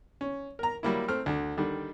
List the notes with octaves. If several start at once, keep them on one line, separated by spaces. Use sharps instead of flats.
C#4
A#4 A#5
F#3 G3 A#3 E4
A3 C4 F6
D2 D3
D3 D#3 G3